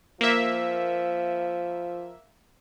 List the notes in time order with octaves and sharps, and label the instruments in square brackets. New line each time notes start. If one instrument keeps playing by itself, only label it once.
[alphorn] F3 [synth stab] A#3 E5